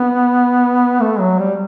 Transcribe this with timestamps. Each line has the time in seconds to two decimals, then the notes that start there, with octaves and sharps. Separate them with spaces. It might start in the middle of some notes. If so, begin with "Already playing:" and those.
Already playing: B3
1.00 A3
1.20 F#3
1.39 G3